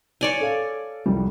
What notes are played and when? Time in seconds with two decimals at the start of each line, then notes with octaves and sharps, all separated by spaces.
0.21 C#5 D5 G#5
0.40 A4 F5
1.06 C2 F2 G3